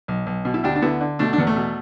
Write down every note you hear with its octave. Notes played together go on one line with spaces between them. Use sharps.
B1
B1
B2
E4
D2 D4 G4
D4
D3 B3 E4
D3
B2 A3 D4
D4
E2 B3
A3
B2